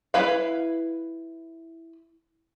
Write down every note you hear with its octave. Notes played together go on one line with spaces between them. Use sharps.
E4 B4 F5